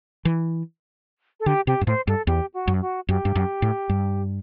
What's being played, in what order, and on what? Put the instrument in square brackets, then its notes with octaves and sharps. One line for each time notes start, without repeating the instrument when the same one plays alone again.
[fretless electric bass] E3
[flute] A4
[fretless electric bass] D3 [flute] G4
[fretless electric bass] C3 [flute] G4
[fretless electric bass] G2
[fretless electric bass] A2 [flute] C5
[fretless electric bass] G2 [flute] A4
[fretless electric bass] E2 [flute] G4
[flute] F#4
[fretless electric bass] F#2
[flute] F#4
[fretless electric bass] F#2 [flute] G4
[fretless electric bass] G2
F#2
A2
G2